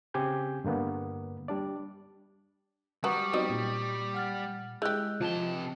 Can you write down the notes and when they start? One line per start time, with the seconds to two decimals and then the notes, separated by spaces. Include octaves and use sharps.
0.14 C#3 C4 G4 G#5 G6
0.64 G2 D3 A#3 B3
1.48 G3 D4 D5
3.04 G3 F#4 B4 A#5 C#6 D#6
3.33 F#3 B3 C4 D#4 D5 D#5
3.50 A#2
4.14 F#5 F6 A6
4.82 G#3 E4 G4 E6 F#6 G6
5.21 C3 F3 D#5 A5 G7